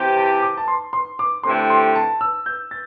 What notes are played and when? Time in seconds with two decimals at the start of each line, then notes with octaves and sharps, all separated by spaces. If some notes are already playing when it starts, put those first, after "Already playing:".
Already playing: C3 E3 C4 G4
0.17 A5
0.42 D6
0.57 A5
0.68 C6
0.93 C6
1.19 D6
1.43 D3 A3 C4 E4 G4 C6
1.70 C6
1.95 A5
2.21 E6
2.46 G6
2.71 A6